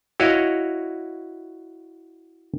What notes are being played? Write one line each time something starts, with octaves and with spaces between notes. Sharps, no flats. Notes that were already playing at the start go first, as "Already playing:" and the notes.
E4 F#4 C#5 D#5 F5